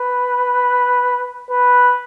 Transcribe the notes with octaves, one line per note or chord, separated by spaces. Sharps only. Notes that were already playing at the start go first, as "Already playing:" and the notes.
Already playing: B4
B4